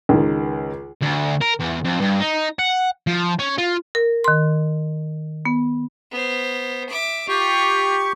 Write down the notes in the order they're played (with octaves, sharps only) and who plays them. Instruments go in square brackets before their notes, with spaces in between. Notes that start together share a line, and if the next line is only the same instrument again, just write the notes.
[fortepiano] C#2 D#3
[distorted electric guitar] D2
A#4
E2
F2
G2
D#4
F#5
F3
C#4
F4
[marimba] A#4
D#3 C6
B3
[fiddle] B3 C5
E5 D6
[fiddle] F4 [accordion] G4 C#6